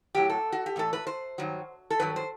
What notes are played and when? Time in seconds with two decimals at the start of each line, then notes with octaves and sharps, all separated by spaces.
0.15 A2 F#3 G4
0.30 A4
0.52 F#4
0.66 G4
0.76 A2 E3 A4
0.93 B4
1.07 C5
1.38 G2 D#3 F#3
1.90 A4
2.00 G2 D#3 F#3 B4
2.16 C5